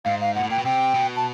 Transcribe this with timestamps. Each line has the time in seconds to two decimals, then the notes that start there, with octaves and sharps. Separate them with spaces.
0.05 G#2 F5
0.21 F5
0.35 A#2 F#5
0.43 A2
0.50 A#2 G5
0.59 B2
0.65 C3 G5
0.95 B2
1.16 A5